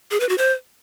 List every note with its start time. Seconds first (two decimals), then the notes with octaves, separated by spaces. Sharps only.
0.11 G#4
0.20 B4
0.29 F#4
0.38 C5